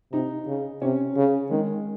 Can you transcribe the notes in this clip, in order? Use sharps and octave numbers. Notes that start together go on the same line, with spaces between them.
C3 D#4
C#3
C3 C#4
C#3
D#3 G#3